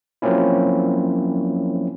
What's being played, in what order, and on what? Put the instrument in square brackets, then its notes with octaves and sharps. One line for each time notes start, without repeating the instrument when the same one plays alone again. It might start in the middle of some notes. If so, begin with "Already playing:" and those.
[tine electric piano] F3 F#3 A#3 C4 C#4 E4